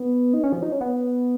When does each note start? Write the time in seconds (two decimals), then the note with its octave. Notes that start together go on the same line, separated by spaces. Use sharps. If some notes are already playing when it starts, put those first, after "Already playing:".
Already playing: B3
0.33 D#4
0.44 C#4
0.52 F3
0.63 D#4
0.72 C#4
0.81 B3